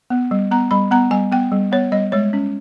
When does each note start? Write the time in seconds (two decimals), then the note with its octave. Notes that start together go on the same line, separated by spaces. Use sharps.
0.10 B3
0.31 G3
0.51 B3 A#5
0.71 G3 B5
0.91 B3 A#5
1.11 G3 G#5
1.32 B3 G5
1.52 G3
1.72 B3 C#5
1.92 G3 D#5
2.12 G#3 C#5
2.33 C#4